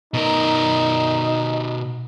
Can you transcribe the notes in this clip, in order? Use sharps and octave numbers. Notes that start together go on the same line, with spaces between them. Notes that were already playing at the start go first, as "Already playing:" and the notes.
B2 D#4 A#4